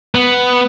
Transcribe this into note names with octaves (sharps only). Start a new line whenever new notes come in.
B3